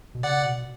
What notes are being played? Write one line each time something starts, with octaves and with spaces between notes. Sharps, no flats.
B2
C#3 D5 F#5
B2